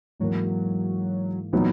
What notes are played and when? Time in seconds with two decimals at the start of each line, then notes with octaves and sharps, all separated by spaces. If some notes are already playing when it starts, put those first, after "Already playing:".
0.20 G#2 E3 F#3 A#3
1.52 A#2 E3 F#3 B3 D#4